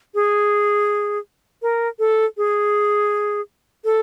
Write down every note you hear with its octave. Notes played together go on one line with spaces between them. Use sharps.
G#4
A#4
A4
G#4
A4